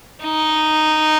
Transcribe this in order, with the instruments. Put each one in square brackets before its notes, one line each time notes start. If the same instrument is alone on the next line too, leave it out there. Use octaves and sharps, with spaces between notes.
[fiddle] D#4